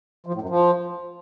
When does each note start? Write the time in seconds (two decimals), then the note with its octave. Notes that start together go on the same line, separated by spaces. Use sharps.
0.26 F3
0.34 A2
0.41 F#2
0.49 F3